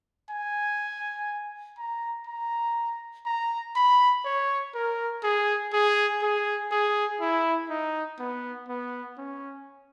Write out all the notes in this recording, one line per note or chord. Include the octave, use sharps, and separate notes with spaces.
G#5
A#5
A#5
A#5
B5
C#5
A#4
G#4
G#4
G#4
G#4
E4
D#4
B3
B3
C#4